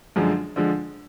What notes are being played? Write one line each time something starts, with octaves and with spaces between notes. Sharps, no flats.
F#2 D3 F3 G#3
D3 F3 G#3